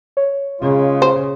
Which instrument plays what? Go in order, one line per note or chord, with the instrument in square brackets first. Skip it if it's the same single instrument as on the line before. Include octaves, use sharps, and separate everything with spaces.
[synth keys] C#5
[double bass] C#3 [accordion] G#3 F4
[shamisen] C5